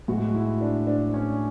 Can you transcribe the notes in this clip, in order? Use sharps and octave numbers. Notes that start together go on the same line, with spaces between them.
A2 G#3 F#4
E4
D4
D4
C#4